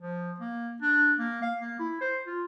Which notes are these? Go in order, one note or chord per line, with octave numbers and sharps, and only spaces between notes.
F3
A#3
D4
A#3
F5
A#3
E4
C5
F4